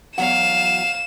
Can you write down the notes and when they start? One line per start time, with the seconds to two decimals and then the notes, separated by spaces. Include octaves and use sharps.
0.18 E2 F#3 F5 F#5 E7